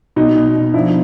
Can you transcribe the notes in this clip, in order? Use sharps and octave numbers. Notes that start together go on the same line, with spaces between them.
B2 D#4
B2
B2
F3 D4 E4